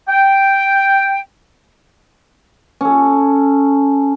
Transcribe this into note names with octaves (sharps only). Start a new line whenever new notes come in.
G5
C#4 A4